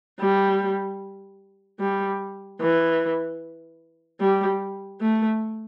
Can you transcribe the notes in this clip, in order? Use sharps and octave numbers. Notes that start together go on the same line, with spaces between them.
G3
G3
E3
G3
A3